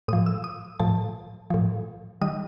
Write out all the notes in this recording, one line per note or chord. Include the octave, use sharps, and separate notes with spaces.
A2 F3 D#6
E6
D#6
A2 F3 A5
A2 F3
D#3 G3 D#6